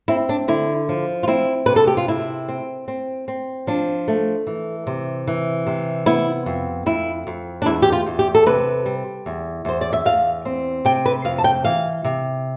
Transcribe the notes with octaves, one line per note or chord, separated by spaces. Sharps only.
C4 E4
D4
D3 E4
F3
F4
C4 E4
C3 B4
A4
G4
F4
C3 E4
C4
C4
C4
F3 D4
A3
E3
C3
E3
C3
B3 E4
F2
F2 E4
F2
D4
E2 E4
G4
F4
E2
G4
A4
C3 B4
G3
E2
E2 C5
D5
E5
E2 F5
C4
C3 G5
B4
F2 F5
A5
G5
E3 F5
C3